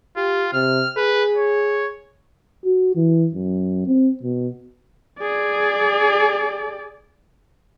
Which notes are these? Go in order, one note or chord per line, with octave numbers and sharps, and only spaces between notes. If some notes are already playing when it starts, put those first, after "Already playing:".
F4 G4
C3 F6
G#4 B4
C#5
F#4
E3
F#2
C4
B2
G#4 D5